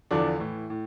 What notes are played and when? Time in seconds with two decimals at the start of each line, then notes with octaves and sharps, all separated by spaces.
0.11 E2 D3 F3 D4
0.40 A2 E3
0.70 A2